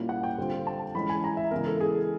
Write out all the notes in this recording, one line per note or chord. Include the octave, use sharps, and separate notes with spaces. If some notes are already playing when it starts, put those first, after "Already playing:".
Already playing: A#2 G3 A#3 C#4 E4
F#5
G5
D3 G3 C4 F4
A5
E3 G#3 C#4 B5
G#5
A#5
E5
C#3 E3 G#3 B3 A#4
A4
G#4